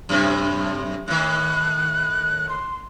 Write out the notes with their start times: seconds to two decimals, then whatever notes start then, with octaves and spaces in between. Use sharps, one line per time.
0.09 F#2 A2 C3
1.08 A2 D#3 F#6
2.49 C6